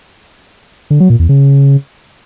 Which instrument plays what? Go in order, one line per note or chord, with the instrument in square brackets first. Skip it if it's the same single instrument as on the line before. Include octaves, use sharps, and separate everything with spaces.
[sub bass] D3
F#3
A#2
E2
C#3